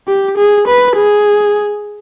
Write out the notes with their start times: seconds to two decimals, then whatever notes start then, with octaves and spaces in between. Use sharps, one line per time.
0.08 G4
0.38 G#4
0.68 B4
0.97 G#4